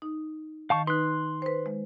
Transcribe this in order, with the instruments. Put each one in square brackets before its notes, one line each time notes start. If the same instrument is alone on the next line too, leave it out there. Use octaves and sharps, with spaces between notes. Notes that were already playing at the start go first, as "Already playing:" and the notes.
[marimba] D#4
[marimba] D#3 [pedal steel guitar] F5 A5 C#6
[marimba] D#4 B4 [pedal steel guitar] C6 F#6
[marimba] B4 C5
G#3